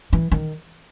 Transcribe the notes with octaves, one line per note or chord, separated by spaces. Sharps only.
E3
D#3